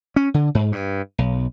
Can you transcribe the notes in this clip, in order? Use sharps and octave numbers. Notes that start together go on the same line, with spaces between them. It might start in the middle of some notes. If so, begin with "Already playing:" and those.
C#4
D3
G#2
G2
B1